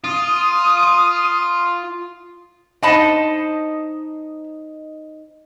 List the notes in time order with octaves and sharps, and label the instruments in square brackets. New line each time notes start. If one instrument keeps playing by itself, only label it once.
[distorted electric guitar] F4 [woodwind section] D#6
[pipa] D4 A5 B5 [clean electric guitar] D#4 C5 D#5